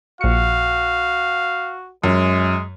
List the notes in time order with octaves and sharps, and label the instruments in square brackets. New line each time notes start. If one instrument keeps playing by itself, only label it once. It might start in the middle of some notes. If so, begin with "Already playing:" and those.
[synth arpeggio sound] A#1 C#7 [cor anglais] F#4 [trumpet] F5
[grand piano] F#2 [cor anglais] G#3